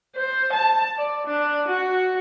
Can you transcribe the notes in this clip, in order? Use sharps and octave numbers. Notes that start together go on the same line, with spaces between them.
C5
A5
D5
D4
F#4